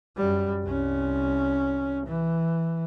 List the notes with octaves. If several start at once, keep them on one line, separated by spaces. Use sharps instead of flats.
F#2 G3
C2 C#4
E3